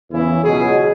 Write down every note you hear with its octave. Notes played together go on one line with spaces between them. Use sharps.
E2 C#3 E3 E4
C#2 B2 F#3 G#4